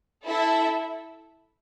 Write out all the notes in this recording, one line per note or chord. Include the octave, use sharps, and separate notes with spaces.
E4 A4 E5